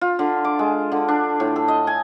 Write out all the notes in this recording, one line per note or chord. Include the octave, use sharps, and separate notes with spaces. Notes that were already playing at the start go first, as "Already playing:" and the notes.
F4
D3
D6
G#3
D3
D4
A2
A4
D#5
G#5